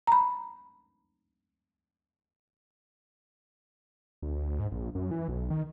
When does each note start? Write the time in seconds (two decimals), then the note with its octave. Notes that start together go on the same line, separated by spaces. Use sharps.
0.07 A#5 B5
4.22 D2
4.59 G#2
4.72 A#1
4.95 F#2
5.11 E3
5.28 B1
5.51 D#3